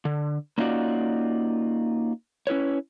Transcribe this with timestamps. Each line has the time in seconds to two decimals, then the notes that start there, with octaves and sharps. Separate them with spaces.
0.05 D3
0.58 A#3 C#4 D#4 F4 F#4 D5
2.47 C#4 E4 B4 C#5